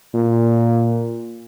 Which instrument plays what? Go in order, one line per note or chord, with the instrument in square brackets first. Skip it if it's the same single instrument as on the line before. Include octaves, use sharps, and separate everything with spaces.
[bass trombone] A#2